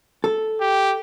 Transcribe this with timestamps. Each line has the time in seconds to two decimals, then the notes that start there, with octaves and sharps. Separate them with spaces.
0.24 A4
0.61 G4